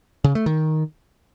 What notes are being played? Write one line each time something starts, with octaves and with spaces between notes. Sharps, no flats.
C#3
A3
D#3